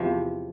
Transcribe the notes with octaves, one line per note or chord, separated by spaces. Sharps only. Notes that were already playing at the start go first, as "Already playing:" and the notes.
Already playing: E2 C3 F3